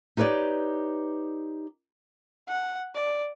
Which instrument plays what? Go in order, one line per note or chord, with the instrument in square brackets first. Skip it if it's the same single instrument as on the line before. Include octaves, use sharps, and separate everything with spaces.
[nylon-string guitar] D#4 G4 B4 C#5 D5
[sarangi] F#5
D5